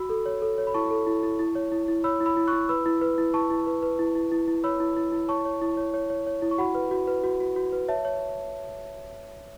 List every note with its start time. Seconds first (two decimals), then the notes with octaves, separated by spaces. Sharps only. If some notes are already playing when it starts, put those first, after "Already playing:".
Already playing: F#4 B5 E6
0.10 A4
0.26 C#5
0.42 A4
0.58 C#5
0.67 B5
0.74 E4 A5 C#6
0.91 A4
1.07 E4
1.23 E4
1.39 E4
1.55 C#5
1.72 E4
1.88 E4
2.04 C#5 B5 E6
2.20 E4
2.26 B5 E6
2.37 E4
2.47 C#6 F#6
2.53 E4
2.69 B4 B5 E6
2.86 E4
3.01 B4
3.18 E4
3.34 E4 A5 C#6
3.50 E4
3.67 B4
3.83 B4
3.99 E4
4.15 E4
4.32 E4
4.48 E4
4.64 C#5 B5 E6
4.80 E4
4.97 E4
5.12 E4
5.29 C#5 A5 C#6
5.45 C#5
5.62 E4
5.77 C#5
5.94 C#5
6.10 C#5
6.27 C#5
6.42 E4
6.51 C#6
6.58 F#4 F#5 B5
6.75 B4
6.91 F#4
7.08 B4
7.24 F#4
7.40 F#4
7.56 F#4
7.72 B4
7.88 C#5 E5 A5
8.05 C#5